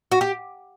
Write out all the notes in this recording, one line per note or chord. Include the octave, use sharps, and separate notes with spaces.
F#4
G4